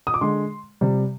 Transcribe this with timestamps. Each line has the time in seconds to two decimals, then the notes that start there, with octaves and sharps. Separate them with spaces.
0.07 D#6
0.14 D6
0.21 D3 G#3 C6
0.81 C3 G3